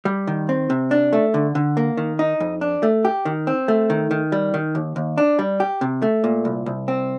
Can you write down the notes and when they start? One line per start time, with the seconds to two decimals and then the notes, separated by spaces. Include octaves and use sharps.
0.05 G3
0.27 D#3
0.49 C4
0.70 C3
0.91 D4
1.13 A3
1.34 D3
1.55 D3
1.77 A#3
1.97 D#3
2.19 D#4
2.40 F2
2.61 D4
2.83 A3
3.05 G4
3.25 D#3
3.47 C4
3.68 A3
3.90 D#3
4.11 D#3
4.32 G3
4.54 D#3
4.75 D#2
4.96 D#2
5.18 D4
5.39 G3
5.60 G4
5.81 C3
6.02 A3
6.24 A#2
6.45 C2
6.66 C2
6.88 C4